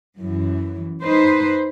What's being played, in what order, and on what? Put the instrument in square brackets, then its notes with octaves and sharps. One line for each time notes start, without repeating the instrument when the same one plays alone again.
[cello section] F#2 E3
D#4 B4 C5